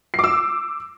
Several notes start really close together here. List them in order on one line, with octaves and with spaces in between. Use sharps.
C7 D6 E6